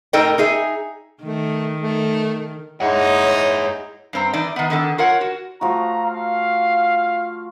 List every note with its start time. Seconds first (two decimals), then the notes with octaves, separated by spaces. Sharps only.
0.13 A2 D#4 A4 A#4 D#5 G5
0.38 D#4 G#4 E5 G#5
1.24 D#3 A3
1.81 A3
2.81 G#3 D#4 E4 G#4 C#5 F#5
4.13 G2 C4 A#5
4.33 E3 D#4 D5
4.56 D#3 B3
4.70 D3 D#3 B3 A4
4.98 F4 A#4 C#5 F#5
5.21 F#4
5.61 F3 A3 F#4 A#5
6.06 F5